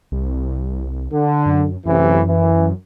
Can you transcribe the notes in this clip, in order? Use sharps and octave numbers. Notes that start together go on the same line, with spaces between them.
C2
D3
F#2
A1 F#2 C3 E3
E3